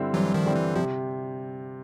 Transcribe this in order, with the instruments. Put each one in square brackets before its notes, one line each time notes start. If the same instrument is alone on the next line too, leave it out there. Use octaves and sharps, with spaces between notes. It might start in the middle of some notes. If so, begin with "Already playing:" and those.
Already playing: [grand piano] G2 D3 G3 C4 E4
[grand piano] G2 [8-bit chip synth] E3 F#3
[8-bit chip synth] D#3 F3
[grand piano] D3 G3 C4 E4
[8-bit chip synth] E3
[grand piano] C3 [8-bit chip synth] F3